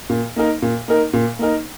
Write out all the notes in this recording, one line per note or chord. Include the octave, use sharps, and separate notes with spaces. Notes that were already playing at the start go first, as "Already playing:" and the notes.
A#2
A#3 D#4 A#4
A#2
A#3 D#4 A#4
A#2
A#3 D#4 A#4